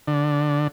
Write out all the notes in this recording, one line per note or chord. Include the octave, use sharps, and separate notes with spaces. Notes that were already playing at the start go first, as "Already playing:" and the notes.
D3